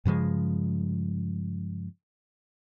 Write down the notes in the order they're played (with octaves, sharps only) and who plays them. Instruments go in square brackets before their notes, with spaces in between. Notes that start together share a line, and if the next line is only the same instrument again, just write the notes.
[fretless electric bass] G2 C#3 F3 G#3